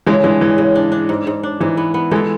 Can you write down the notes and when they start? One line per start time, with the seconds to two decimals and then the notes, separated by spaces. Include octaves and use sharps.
0.06 C#3 E3 G#3
0.24 E3 G#3 D4
0.41 C#3 E3
0.58 C#3
0.76 D4
0.92 D4
1.09 G#2
1.27 G#2
1.43 D4
1.60 G#2 E3
1.77 B3
1.94 B3
2.11 E3 G#3 A4